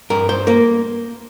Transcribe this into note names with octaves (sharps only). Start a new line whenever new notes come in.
G2 A#4
C5
A#3 A#4